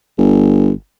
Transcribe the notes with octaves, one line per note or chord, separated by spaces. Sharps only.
G1